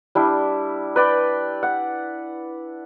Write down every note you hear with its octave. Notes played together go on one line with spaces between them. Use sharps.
G3 D4 E4
B4 D5 G5
F#5